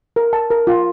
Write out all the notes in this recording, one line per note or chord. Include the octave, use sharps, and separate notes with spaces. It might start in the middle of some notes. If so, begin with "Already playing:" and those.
A#4
A5
A#4
F4